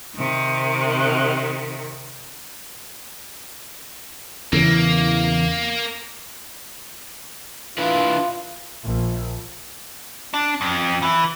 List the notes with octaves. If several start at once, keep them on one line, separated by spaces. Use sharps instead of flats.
C3 D#3
E2 C#3 E3 A#3
D4 E4 F4 B4
A#1
D4
F2
E3